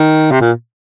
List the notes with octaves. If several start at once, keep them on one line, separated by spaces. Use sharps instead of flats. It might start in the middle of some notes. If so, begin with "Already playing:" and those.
Already playing: D#3
C3
A#2